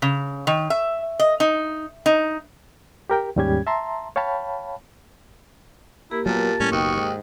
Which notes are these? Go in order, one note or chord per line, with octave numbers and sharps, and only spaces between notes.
C#3
D#3
E5
D#5
D#4
D#4
G4 A#4 G5
D#2 G#2 G3 C#4 G4 G#6
E5 A5 A#5 C6
C#5 F5 G5 A5 B5
A#3 E4 G4 A#4
A#2 F#3 G#3 B3 A5
A2 G3 C#4
F#1 D#2 B2 G5 C#6 D#6
G#2